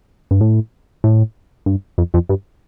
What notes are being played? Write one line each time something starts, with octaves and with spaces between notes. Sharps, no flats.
G2
A2
A2
G2
F2
F2
G2